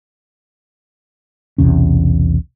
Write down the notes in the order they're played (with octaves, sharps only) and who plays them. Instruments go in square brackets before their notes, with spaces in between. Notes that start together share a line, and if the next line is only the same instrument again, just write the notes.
[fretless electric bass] B1 E2 C3 C#4